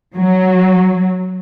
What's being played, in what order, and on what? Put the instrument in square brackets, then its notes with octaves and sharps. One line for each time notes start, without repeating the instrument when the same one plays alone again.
[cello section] F#3